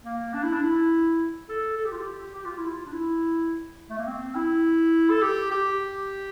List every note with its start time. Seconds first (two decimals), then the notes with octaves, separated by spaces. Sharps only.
0.05 A#3
0.33 D4
0.43 E4
0.52 D4
0.62 E4
1.49 A4
1.77 A4
1.85 G4
1.92 F4
2.00 G4
2.35 G4
2.46 F4
2.57 E4
2.68 F4
2.86 D4
2.92 E4
3.90 A3
3.99 A#3
4.07 C4
4.35 E4
5.10 A4
5.22 G4
5.51 G4